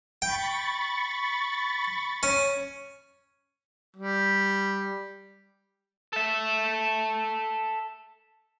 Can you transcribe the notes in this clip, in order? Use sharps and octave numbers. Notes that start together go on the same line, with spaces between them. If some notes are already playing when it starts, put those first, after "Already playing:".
G5 B5 C#6 A6
C#4
G3
A4 E5